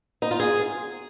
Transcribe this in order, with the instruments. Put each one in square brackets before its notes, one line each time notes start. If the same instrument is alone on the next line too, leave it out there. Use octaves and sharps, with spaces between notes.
[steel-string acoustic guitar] D#4
F4
G#4